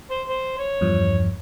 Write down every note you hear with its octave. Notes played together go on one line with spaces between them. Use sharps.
C5
C5
C#5
E2 G2 F3